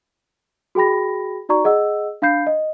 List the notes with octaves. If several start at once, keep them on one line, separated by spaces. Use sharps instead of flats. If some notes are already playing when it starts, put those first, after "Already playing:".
F#4 G#4 G5 B5 A#6
D#4 F#4 D5 A#5 C#6
G#4 D#5 F#5 E6
D4 F5 B5 G6 C7
D#5